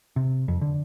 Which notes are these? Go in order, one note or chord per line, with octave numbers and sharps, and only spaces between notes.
C3
F2
D3